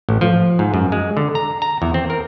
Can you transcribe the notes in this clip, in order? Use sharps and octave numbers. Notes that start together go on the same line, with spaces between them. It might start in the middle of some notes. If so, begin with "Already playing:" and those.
A1
F3
G#2
F#2
G#3
D3
A#5
A#5
E2
C4
A#4